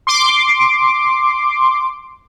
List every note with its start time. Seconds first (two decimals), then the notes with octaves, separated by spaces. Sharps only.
0.07 C6 D6